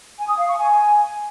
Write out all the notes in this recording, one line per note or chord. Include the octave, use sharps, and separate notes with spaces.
G#5
D#6
F5
C#6
G#5